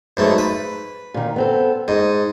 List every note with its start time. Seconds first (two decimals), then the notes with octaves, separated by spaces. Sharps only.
0.17 B1 G#2 A3
0.38 B4
1.14 A#2 D#3
1.36 B3 C4 A4
1.88 G#2 D#5